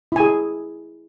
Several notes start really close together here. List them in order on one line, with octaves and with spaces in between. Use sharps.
E4 G#5 G#4